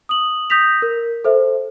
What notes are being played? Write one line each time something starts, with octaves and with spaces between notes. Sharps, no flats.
D#6 F#7
D#6 G6 A#6 B6 F7
A#4
A4 C5 E5